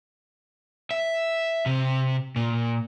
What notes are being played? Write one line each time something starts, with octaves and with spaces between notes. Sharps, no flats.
E5
C3
A#2